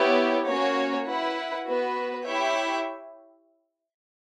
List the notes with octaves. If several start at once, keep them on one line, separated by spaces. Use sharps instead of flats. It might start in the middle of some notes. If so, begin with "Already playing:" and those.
Already playing: B3 E4 G4 C#5
A#3 C#4 F#4 C#5
E4 B4 F#5
B3 F#4 B4
E4 G4 C#5 E5 G5